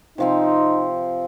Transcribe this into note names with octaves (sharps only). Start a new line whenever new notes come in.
C3 F3 C4 D#4